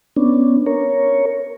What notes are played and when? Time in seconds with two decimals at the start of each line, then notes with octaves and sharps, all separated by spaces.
0.16 B3 C#4 D4
0.66 A#4 C#5